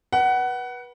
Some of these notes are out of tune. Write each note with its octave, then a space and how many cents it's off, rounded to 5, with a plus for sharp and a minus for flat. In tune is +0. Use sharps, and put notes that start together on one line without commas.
B4 -25 F#5 +20